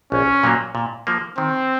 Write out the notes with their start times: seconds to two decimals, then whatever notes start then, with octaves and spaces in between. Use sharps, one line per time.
0.12 A#1 C#4
0.43 A#2 F#3 A#3
0.75 A#2
1.07 F3 A#3
1.38 D#3 C4